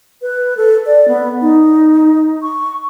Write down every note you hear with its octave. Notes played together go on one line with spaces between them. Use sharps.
B4
A4
D5
B3
D#4
C#6